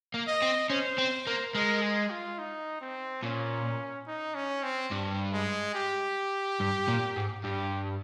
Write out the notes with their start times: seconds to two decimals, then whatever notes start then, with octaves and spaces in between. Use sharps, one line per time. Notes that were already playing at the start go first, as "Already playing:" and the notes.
0.14 A#3
0.28 D#5
0.42 C4
0.70 C#4 C5
0.98 C4
1.27 A#3
1.54 G#3 A#4
1.82 G#4
2.11 F4
2.39 D#4
2.81 C4
3.23 A#2 C#4
4.07 D#4
4.35 C#4
4.63 C4
4.91 G2
5.33 G#3
5.75 G4
6.60 G2
6.88 A#2
7.16 G#2
7.44 G2 G4